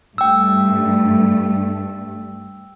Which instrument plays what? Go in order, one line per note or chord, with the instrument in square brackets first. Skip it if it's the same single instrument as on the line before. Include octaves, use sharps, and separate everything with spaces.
[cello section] G2 A3 [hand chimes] G5 E6